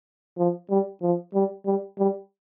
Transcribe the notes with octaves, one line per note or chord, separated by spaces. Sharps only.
F3
G3
F3
G3
G3
G3